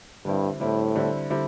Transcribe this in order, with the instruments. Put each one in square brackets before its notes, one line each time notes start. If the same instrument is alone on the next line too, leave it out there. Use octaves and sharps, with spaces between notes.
[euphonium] G2 [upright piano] D3 G3 C4 E4
[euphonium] A2 [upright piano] D3 G3 C4 E4
[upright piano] D3 G3 C4 E4
D3 G3 C4 E4